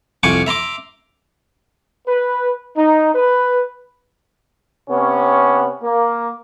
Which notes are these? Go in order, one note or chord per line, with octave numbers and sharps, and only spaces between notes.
C2 F2 F#5 G#5 C#6 D6
E5 A#5 C6 D6
B4
D#4
B4
C3 B3 C#4
A#3